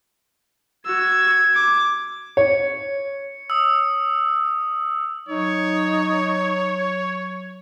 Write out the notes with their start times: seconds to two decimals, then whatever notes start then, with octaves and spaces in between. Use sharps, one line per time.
0.86 F#4 E6 G#6
1.55 D6
2.37 C#5 C#7
3.50 D#6 E6
5.29 F#3 D#4 C#5